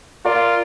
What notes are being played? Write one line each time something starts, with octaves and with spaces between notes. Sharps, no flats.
F4 A#4 D5